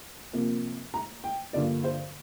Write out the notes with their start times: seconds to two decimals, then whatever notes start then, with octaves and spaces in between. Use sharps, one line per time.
0.33 C3 F3 A#3
0.94 A#5
1.24 G5
1.53 G2 D3 F3 A#3 D5
1.84 C5